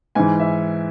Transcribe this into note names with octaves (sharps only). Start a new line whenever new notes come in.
G#2 E3 G#5
E5